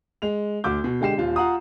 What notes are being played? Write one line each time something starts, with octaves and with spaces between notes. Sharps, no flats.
G#3 F7
D2 F#4 D6 G6
B2
D3 G#3 G4 C7 E7
D#1 F4
F4 F#5 A#5 D#6